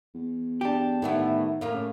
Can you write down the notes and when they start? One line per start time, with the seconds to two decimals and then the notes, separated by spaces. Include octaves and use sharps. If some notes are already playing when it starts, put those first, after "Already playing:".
0.15 E2
0.61 D4 G4
1.02 A2 D#3 E3 B3
1.61 A2 A#3 F4
1.73 C#3